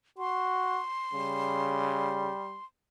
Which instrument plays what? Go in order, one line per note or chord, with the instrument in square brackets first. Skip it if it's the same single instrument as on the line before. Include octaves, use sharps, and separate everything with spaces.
[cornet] F#4 [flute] C6
[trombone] C#3 [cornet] G3